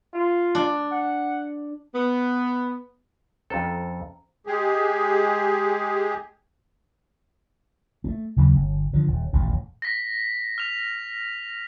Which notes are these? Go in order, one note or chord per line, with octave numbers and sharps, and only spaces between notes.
F4
D4
F#5
B3
F2 C#4 A4 C5 A#5
G#3 G4 G#4
A3 A#3
D#2 C#3 F#3 A#3
G1
D3 D#3 F3
D#1
D#1 A1 E2 A#2
A#6 B6
F6 F7